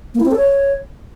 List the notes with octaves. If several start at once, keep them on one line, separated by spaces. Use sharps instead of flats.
A#3
E4
C4
A4
C#5